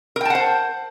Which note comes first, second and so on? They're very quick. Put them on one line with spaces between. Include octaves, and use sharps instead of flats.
A#4 G5 A5 F#5 C5